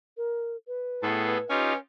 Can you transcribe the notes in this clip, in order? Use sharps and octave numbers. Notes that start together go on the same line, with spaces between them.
A#4
B4
A2 B3 G#4 A4
C#4 D#4 F4 G4